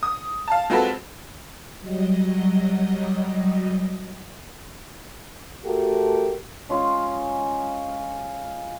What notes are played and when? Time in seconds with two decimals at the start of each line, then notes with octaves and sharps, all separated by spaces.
0.03 D#6
0.48 F5 A5
0.70 G#3 C4 F4 F#4 A4 B4
1.80 F#3 G3 D#5
5.65 A3 F#4 G4 A4 A#4
6.69 G#3 C#4 F4